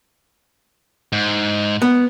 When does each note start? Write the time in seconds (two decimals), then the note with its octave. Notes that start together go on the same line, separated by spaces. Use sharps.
1.13 G#2
1.82 B3